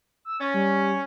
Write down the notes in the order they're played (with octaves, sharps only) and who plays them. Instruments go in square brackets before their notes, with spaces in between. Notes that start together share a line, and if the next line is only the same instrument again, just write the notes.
[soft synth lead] E6
[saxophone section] C#4 [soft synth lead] A6
[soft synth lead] G3